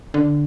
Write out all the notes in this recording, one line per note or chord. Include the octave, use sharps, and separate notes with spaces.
D3